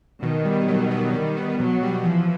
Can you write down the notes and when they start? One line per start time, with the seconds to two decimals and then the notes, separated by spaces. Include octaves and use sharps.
0.22 B2 D#3
0.45 G3
0.68 F#3
0.91 B3
1.14 D#3 G3
1.37 B3
1.59 B2 F#3
1.83 G3
2.05 E3 F3